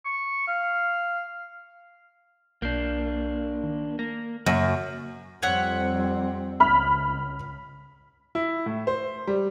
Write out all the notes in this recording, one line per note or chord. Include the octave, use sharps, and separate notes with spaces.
C#6
F5
B1 A#3 D4 G6 C7
D#3
A#3 A#6
F#2 C#3 A#3 F#4 C#6
F2 G3 C4 C#5 E5 F#5
C#2 B5 F6
E4
A2
C5
G3